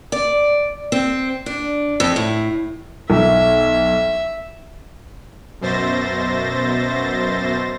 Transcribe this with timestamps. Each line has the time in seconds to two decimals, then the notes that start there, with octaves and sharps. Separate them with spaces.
0.12 D5
0.92 C4
1.46 D4
2.00 F2
2.16 A2
3.10 B1 E5
5.61 F#2 B2 C5 E5 A6 A#6